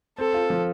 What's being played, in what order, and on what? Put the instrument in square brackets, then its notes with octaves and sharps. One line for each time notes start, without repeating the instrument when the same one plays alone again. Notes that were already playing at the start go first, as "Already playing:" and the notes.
[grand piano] C4 [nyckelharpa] A4
[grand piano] F4
F3